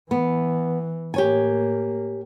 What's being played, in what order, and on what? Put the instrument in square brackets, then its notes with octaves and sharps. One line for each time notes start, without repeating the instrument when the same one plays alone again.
[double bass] E3 [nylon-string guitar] B3
[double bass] A2 A#3 [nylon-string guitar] G4 C#5 G#5